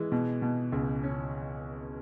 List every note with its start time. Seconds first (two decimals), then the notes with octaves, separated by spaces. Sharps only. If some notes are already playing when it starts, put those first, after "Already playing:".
Already playing: E3 G#3
0.12 B2
0.42 B2
0.72 C#2
1.03 C#4